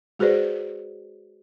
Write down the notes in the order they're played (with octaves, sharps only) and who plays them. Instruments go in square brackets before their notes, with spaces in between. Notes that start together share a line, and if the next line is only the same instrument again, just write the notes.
[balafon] G#3 F#4 G#4 B4 C5 D5